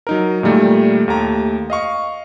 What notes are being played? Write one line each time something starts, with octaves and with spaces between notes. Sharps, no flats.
F#3 D#4 A#4
A#2 D#3 G3 A3
D#2 A3 G4 A#5
D#5 F5 C#6